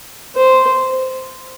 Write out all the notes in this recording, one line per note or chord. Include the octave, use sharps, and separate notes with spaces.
C5